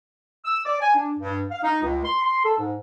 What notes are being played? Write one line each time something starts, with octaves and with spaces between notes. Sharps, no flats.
E6
D5
G#5
D4
G2
F5
D#4
C#2
C6
C6
A4
G#2